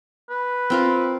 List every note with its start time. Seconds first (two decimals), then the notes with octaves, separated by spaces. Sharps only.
0.30 B4
0.70 C4 F4 A#4